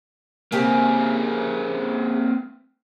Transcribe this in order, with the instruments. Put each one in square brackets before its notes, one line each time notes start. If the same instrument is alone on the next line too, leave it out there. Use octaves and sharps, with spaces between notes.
[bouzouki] C#3 G4 G#4 [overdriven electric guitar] A#3 C4